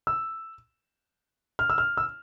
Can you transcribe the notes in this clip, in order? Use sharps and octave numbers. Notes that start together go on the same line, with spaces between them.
E6
F6
E6
F6
E6